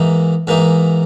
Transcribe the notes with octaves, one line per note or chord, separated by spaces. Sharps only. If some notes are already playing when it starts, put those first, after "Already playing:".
Already playing: G#2 E3 A#3 D#4
G#2 E3 A#3 D#4